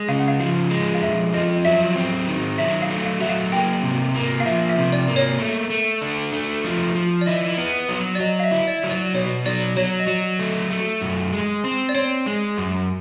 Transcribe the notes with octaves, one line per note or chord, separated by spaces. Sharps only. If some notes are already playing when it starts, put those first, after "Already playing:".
Already playing: G#3
C#3 F5
F#5
F5
F3 F5
G#3
F5
F2 E5
F3 D#5
F#3 E5
C4
D#3
F#3 E5
F5
A3
F5
F#3 E5
F5
A#3 G5
C3
A#3
F5
F3 E5
E5
C3
D5
A#3
C#5
A3
A3
D4
A3
F3
F3
D5
E4 D#5
B3
F#3
D5
F#3 D#5
F5
E5
E4
D5
F#3
D5
B2 C#5
F#3 D5
F#3 C#5
D#5
F#3 D5
A3
A3
F#2
G#3
C4
D5
C4 C#5
G#3
F#2